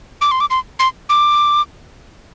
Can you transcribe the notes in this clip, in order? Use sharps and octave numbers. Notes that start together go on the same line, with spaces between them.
D6
C6
D6
C6
C6
D6